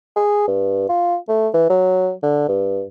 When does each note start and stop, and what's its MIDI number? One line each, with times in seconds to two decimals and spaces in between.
0.16 0.47 68
0.48 0.88 43
0.89 1.17 65
1.29 1.49 57
1.54 1.67 52
1.70 2.12 54
2.23 2.45 50
2.48 2.83 43